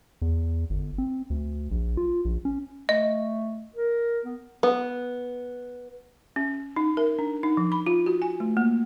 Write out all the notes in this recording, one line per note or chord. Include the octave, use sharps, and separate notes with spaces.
E2
G1
C4
D2
A#1
F4
A#1
C#4
A3 D#5
A#4
B3
B3
C#4
D#4
A#4
D4
D#4
F3
B5
F4
F#4
G#5
A3
A#3